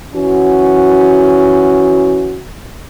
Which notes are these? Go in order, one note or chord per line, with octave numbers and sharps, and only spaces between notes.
E3 C#4 F#4